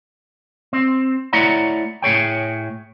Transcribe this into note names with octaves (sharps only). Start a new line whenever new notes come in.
C4
A3 E4 C#5 D5 F#5 A#5
A2 G#4 C#5 G5